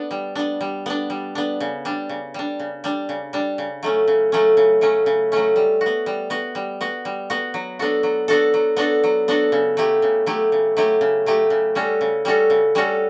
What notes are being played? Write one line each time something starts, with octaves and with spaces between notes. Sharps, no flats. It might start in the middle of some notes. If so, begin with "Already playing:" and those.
Already playing: B3 D4
G3
B3 D4
G3
B3 D4
G3
B3 D4
C#3
G3 D4
C#3
G3 D4
C#3
G3 D4
C#3
G3 D4
C#3
F#3 A3 C#4
C#3
F#3 A3 C#4
C#3
F#3 A3 C#4
C#3
F#3 A3 C#4
G3
F#4
B3
G3
B3 F#4
G3
B3 F#4
G3
B3 F#4
F#3
B3 D4 F#4 A4
F#3
B3 D4 F#4 A4
F#3
B3 D4 F#4 A4
F#3
B3 D4 F#4 A4
C#3
F#3 A3 E4 G4
C#3
F#3 A3 E4 G4
C#3
F#3 A3 E4 G4
C#3
F#3 A3 E4 G4
C#3
G3 C#4 F#4 A4
C#3
G3 C#4 F#4 A4
C#3
G3 C#4 F#4 A4